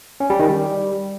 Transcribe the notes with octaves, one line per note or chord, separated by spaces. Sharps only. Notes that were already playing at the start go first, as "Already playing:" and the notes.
C#4
G3
D#3
G3